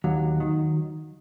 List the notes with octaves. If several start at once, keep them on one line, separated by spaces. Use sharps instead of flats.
D#2 F#3
D#3